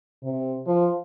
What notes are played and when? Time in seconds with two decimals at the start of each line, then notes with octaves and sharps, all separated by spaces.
0.23 C3
0.67 F3